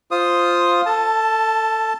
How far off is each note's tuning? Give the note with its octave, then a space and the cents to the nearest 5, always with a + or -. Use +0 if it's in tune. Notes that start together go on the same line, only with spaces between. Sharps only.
F4 +0 C5 +0 D#6 +0
A4 +20 A5 +0